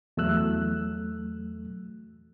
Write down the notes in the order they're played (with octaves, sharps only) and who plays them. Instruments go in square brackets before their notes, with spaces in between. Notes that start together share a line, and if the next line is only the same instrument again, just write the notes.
[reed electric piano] E2 F#3 A3 E6 F#6